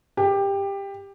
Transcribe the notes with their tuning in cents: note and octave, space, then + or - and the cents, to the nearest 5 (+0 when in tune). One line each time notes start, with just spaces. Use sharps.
G4 +15